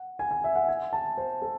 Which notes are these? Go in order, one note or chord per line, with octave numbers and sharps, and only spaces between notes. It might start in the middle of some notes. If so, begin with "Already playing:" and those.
Already playing: F#5
G#5
G#5
E5
F#5
G#5
A5
C5
A4